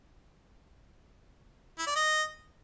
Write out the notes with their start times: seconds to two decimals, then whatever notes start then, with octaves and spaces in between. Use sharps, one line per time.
1.79 E4
1.87 D5
1.95 D#5